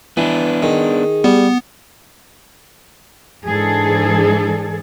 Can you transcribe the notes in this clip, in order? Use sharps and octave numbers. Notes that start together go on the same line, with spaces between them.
E3 B3 D4
D#3 G#4
G3 B3
G#2 E3 D4 G#4 A4